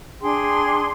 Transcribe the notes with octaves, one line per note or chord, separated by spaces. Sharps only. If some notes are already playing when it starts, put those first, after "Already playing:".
D4 G#4 G5 C6